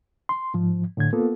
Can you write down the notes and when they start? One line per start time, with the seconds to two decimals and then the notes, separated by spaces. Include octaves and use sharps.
0.29 C6
0.54 G#2 F3
0.97 A2 D3 G#6
1.13 A#3 B3 F4 A4